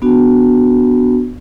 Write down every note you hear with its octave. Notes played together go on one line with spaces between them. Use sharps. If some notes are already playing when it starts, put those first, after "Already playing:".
B3 D4 F#4